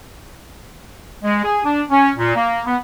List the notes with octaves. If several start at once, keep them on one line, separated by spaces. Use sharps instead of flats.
G#3
G#4
D4
C#4
A#2
A#3
B3